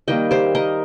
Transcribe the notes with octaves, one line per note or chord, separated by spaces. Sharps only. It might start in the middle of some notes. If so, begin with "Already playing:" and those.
D#3 G3 A#3 D#5 G5
G4 C5
A#4 D#5